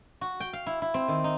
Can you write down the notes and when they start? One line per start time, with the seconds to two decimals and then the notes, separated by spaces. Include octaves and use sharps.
0.21 F#4
0.40 G5
0.53 F5
0.67 E4
0.82 E4
0.94 C4
1.08 D#3
1.24 D#4